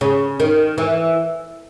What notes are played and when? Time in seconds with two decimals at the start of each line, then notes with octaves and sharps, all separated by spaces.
0.01 C#3
0.40 D#3
0.78 E3